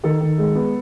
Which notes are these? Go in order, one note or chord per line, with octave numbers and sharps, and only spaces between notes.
D#3 A4
D#3
G#3
B3